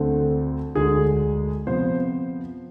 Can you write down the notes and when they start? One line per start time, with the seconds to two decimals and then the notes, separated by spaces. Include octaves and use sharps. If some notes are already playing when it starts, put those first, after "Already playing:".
Already playing: D2 D3 A3 C4
0.75 D2 D3 G#3 G#4
1.67 C3 F3 B3 C5